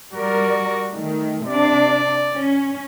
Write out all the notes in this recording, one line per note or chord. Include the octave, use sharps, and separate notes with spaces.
G3 F#4 A#4 D5
D#3 A3
C3 D4 D5
C#4